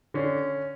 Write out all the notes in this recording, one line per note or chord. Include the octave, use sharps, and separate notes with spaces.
D3 C#4